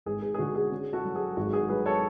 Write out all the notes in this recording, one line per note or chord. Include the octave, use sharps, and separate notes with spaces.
G#1 G#4
G#4
G#4
D3 F#4
G#4
C#4
F#4 A4
F#3
G#4
G#1 F#4
G#4
F#3 G#4 B4
A4 C#5